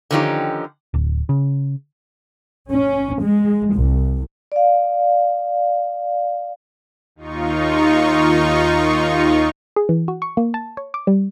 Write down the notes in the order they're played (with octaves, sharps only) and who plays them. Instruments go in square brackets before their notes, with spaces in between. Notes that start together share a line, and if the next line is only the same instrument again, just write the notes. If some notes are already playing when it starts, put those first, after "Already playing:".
[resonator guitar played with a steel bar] D3 D#3 F3 C#4 D#4 G4
[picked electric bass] D1
C#3
[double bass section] C#4
G#3
C2
[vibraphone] D5 F5
[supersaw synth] D#2 D#4 F4 C#6
[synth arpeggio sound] G#4
E3
F#4
C#6
A#3
A5
C#5
D6
G3